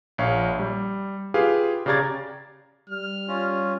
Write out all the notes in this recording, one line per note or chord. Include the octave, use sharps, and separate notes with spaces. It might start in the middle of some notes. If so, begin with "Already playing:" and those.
A#1 C#5 F5
G3
F4 G4 G#4 B4 F5
C#3 G4 D5 A#5 G#6 A6
G3 F6
C#4 F4